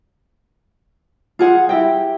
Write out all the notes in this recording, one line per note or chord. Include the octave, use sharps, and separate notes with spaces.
F4 G#4 F#5
E4 G4 G5